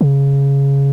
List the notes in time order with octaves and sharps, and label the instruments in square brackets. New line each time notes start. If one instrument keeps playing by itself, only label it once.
[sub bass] C#3